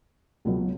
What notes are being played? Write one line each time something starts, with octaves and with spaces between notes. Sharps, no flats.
C#2 B2 F#3